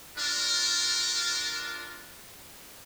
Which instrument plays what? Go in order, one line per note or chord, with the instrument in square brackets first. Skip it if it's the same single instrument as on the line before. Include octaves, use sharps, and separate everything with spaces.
[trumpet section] D4 F4 A#4